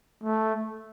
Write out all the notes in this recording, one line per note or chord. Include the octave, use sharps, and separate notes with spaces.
A3